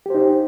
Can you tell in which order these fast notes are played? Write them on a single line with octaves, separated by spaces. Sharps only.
G4 C5 D#4